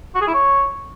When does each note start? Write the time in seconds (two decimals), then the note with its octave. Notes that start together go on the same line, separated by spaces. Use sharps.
0.15 F#4
0.21 G#4
0.28 E4
0.34 C#5